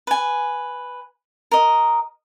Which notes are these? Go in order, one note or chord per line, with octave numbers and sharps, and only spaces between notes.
B4 G#5
A#4 D#5